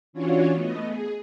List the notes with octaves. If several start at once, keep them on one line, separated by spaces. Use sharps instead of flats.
E3 C#4 D4 F4 F#4 C#5
A3 B3 D#5
G#4